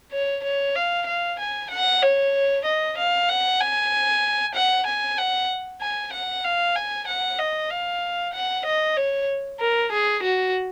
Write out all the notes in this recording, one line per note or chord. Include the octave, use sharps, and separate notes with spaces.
C#5
C#5
F5
F5
G#5
F#5
C#5
D#5
F5
F#5
G#5
F#5
G#5
F#5
G#5
F#5
F5
G#5
F#5
D#5
F5
F#5
D#5
C#5
A#4
G#4
F#4